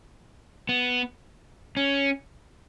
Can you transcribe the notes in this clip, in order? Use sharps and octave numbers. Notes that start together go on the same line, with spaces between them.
B3
C#4